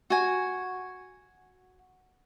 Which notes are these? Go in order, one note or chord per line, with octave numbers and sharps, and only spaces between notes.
F#4 G#5